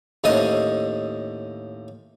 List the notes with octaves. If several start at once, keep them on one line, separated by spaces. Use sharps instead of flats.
D#2 A2 C#4 C5 D#5 D#6